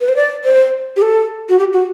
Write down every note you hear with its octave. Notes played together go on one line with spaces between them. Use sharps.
B4
C5
D5
C5
G4
A4
F#4
G4
F#4